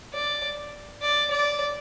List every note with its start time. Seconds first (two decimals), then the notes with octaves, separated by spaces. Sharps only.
0.13 D5
1.02 D5
1.31 D5